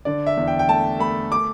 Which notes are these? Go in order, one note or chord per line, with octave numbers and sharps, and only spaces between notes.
D3 D5
E5
E2
G5
G5
A3 A5
A3 B5
D6